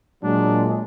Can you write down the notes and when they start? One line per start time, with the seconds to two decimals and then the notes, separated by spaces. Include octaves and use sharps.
0.23 A#2 F#3 G#3 D4